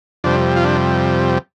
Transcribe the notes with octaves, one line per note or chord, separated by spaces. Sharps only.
F2 C3 G3 D4
F4
D4